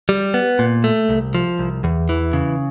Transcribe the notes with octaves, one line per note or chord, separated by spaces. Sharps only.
G3
B3
A#2
A3
C2
F3
C2
E2
E3
C#3